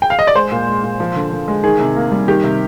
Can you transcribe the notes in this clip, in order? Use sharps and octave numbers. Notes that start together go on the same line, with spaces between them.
G5
F5
D#5
D5
G#3 C5
A#2
G#3
A#2
F3
D3
D3
G#3
D#3 G#4
C3
A#3
G3
D#3 G4
C3